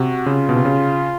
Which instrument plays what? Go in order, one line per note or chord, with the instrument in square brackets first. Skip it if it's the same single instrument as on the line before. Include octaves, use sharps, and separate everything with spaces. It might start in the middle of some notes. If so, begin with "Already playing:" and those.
Already playing: [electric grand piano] C3 [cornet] F#4
[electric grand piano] C#3 [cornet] F4
[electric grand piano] B2
C3
C#3